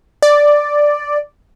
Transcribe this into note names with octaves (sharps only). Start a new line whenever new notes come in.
D5